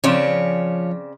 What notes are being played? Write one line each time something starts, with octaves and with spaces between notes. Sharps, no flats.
C#3 F3 C4 C#5 D5